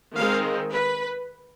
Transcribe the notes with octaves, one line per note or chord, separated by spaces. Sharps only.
D#3 G#3 C4 F5
B4